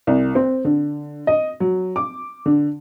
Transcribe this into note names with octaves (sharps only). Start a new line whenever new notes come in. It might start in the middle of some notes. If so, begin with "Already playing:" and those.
C2
C4
D3
D#5
F#3
D6
D3